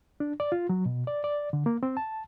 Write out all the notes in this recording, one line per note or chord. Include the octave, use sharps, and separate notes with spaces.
D4
D5
F4
F#3
B2
D5
D5
D3
A#3
C4
A5